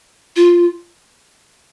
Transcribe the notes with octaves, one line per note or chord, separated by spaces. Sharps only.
F4